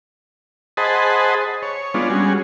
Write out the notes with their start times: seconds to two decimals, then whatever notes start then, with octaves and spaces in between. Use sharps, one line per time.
0.77 G#4 C5 D#5 F#5 A5 B5
1.62 C#5
1.94 G#3 B3 D4 F4
2.10 G3 C#4 F#4 G#4